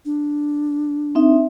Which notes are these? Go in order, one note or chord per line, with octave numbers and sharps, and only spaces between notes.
D4
C4 D#4 E5